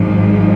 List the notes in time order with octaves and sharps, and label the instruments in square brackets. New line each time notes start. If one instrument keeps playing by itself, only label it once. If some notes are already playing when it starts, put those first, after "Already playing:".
Already playing: [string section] G#1 G#2 F3